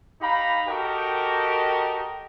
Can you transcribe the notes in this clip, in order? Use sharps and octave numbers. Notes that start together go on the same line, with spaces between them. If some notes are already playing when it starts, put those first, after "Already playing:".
D#4 G4 F5 A#5 B5
F#4 G4 A4 A#4 D#5 G5